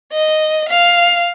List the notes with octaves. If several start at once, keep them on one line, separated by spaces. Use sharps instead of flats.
D#5
F5